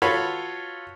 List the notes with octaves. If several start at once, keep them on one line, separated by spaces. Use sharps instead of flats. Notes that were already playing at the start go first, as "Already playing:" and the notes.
F4 F#4 A4 B4 C#5 B5